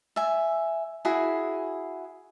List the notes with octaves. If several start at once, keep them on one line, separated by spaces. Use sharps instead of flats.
E5 G#5
E4 F#4 G#4